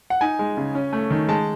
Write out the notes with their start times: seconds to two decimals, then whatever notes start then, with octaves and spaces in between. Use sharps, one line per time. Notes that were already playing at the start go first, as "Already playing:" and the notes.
0.10 F#5
0.21 D#4 G#5
0.39 G#3
0.57 C#3
0.75 C#4
0.93 A3
1.10 D#3
1.28 G#3 A5